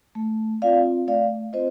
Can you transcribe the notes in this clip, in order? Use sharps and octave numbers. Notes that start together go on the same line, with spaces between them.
A3
C4 F4 D5 F5
A3 D5 F5
C4 F4 C5 D#5